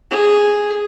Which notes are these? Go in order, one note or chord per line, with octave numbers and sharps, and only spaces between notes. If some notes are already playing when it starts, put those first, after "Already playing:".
G#4